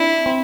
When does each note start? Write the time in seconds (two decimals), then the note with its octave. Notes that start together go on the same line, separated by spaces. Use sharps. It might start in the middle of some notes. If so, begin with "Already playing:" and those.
Already playing: C4 D4 E4
0.26 C4